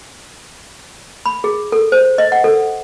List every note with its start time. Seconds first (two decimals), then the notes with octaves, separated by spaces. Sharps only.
1.26 B5
1.44 G#4
1.72 A4
1.92 C5
2.18 D#5
2.32 F#5
2.44 A4